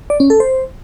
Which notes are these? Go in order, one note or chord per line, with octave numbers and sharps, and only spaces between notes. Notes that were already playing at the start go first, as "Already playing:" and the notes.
D5
C#4
A4
C5